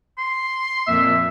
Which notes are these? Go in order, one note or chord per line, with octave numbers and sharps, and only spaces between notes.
C6
F2 A#2 E5